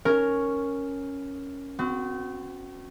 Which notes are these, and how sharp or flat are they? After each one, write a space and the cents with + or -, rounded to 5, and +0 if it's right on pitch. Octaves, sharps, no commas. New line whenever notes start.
C#4 +0 A#4 +0
C4 -40 F#4 -10